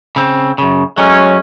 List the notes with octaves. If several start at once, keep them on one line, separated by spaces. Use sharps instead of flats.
C#3 C4
F#2 C#3
F#3 G#3 A3 C#4